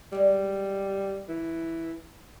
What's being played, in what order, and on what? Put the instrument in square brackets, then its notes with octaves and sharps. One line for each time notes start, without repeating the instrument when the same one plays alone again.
[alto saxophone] G3 [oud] G#3 D5
[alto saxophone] E3